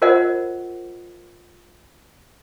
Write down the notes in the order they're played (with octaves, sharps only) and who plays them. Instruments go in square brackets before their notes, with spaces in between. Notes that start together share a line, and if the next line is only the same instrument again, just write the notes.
[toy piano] F4 A#4 C5 D#5 F#5